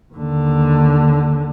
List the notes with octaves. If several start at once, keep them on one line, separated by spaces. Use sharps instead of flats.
D#2 D3